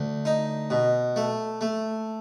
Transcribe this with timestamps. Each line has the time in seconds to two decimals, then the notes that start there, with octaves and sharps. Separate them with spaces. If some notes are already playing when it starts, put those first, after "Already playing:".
Already playing: D2
0.25 D#4
0.70 B2
1.16 A3
1.61 A3